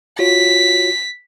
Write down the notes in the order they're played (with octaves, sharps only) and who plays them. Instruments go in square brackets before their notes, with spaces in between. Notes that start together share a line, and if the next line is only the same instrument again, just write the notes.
[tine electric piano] F4 F#4 C#5 [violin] B6